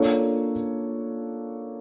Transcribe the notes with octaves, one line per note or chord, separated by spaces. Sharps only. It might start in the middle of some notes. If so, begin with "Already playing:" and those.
Already playing: A#3 D4 F4 A4 C#5